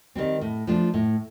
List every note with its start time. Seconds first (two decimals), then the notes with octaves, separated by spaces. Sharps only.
0.15 D#3 G3 C4
0.41 A2
0.67 F3 A3 D4 F4
0.94 A2